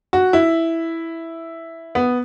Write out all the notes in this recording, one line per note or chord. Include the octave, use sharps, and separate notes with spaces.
F#4
E4
B3